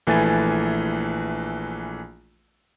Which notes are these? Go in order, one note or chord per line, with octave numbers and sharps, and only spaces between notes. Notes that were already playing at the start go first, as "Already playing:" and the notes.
A#1 E3 A3 G#5 A6